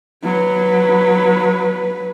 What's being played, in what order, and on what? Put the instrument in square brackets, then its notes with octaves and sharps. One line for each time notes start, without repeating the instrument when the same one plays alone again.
[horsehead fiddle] F#3 B4